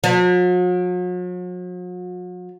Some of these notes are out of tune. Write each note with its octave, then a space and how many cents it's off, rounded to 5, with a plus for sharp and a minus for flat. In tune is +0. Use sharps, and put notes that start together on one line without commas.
F#3 -45